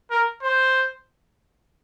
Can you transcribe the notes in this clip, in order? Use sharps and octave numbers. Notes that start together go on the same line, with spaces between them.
A#4
C5